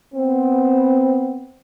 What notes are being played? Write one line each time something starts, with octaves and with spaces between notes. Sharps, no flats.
B3 C4